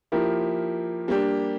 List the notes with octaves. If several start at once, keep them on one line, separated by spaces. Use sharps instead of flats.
F3 A#3 E4 G4 A#4
G3 A#3 D4 G4